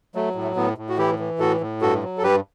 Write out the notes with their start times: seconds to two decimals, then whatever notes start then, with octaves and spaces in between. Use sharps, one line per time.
0.15 F#3 A3
0.35 A2
0.43 A3
0.56 A2 B3
0.78 A2
0.89 F#4
0.98 E3 E4 G4
1.19 E3
1.39 A2 F#4 A4
1.61 A2
1.81 G2 F#4 A4
2.03 F#3
2.18 A4
2.23 G2 G4 B4